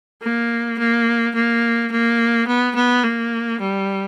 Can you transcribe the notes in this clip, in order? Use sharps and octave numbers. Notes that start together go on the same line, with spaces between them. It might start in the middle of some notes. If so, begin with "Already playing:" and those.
A#3
A#3
A#3
A#3
B3
B3
A#3
G3